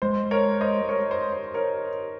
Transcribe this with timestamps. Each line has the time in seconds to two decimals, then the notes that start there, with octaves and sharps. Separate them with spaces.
0.02 G#3 C5
0.31 A#4 C#5
0.61 C5 D#5
0.89 A#4 C#5
1.11 C5
1.33 C5
1.54 A#4 C#5